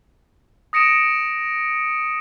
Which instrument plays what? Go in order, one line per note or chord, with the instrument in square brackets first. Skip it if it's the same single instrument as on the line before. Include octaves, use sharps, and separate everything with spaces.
[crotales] D#6 A#6 C#7 D7 E7